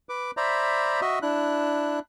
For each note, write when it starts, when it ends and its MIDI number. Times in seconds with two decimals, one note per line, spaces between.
0.09 0.31 71
0.09 0.31 86
0.37 1.01 72
0.37 1.01 74
0.37 1.01 76
0.37 1.01 82
0.37 1.01 83
1.01 1.19 66
1.01 1.19 75
1.01 1.19 76
1.22 1.99 62
1.22 1.99 64
1.22 1.99 90